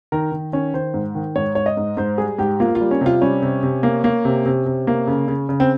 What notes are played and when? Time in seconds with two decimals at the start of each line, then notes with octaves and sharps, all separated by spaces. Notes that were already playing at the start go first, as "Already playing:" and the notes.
0.12 D#3 A#4
0.32 D#3
0.53 D#3 C#4
0.74 D#3 C5
0.94 G#2
1.15 D#3
1.36 G#2 C#5
1.55 G#2 C#5
1.66 D#5
1.77 G#2
1.97 G#2 C5
2.18 G3 G#4
2.38 G#2 G4
2.60 A#3 F4
2.75 F4
2.81 G3
2.91 C#4
3.01 C3 F4
3.21 G3 C#4
3.42 C3
3.63 C3
3.83 A#3
4.04 A#3
4.25 C3
4.46 C3
4.66 C3
4.87 A#3
5.07 C#3
5.28 C#3
5.49 C#3
5.60 C4